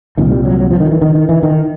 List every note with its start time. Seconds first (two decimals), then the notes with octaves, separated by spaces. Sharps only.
0.17 C2 A#2 D#3
0.31 G3
0.45 F#3
0.60 F#3
0.71 F3
0.80 D#3
0.91 E3
1.02 D#3
1.15 D#3
1.29 E3
1.43 D#3